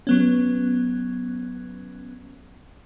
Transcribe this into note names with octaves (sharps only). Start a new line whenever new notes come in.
F#3 B3 C#4